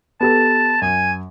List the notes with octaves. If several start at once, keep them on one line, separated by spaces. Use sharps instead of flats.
B3 G4 A4 A5
F#2 G#5